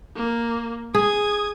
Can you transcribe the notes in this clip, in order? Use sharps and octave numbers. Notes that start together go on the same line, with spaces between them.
A#3
G#4 D#6 G#6